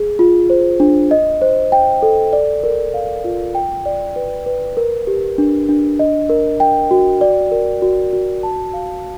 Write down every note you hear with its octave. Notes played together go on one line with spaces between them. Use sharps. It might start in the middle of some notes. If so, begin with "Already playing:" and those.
Already playing: G#4
F4
C5
D4
D#5
C5
G5
A4
D5
A#4
F5
F4
G5
D5
B4
B4
A#4
G4
D4
D4
D#5
A#4
G5
F#4
D5
A#4
F#4
F#4
A5
F5